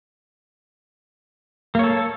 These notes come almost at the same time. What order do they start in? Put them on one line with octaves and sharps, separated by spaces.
A#3 C#5 A4